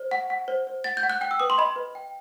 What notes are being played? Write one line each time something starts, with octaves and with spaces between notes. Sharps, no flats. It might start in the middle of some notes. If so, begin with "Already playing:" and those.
Already playing: C5
F#5
F#5
C5
C5
F#5 A6
G6
F#5
F#6
G5 F#6
E6
B4 D#6
C6
D#5 B5
B4
G5